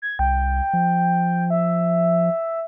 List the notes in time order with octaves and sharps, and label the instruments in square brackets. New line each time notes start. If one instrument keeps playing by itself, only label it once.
[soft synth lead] G#6
[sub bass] C2 [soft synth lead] G5
[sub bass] F3
[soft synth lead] E5